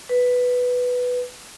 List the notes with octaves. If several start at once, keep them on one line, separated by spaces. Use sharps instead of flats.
B4